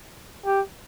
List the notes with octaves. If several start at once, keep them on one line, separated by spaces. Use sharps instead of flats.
G4